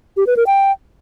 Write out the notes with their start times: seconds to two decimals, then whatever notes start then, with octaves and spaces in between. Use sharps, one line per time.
0.17 G4
0.27 B4
0.37 A#4
0.47 G5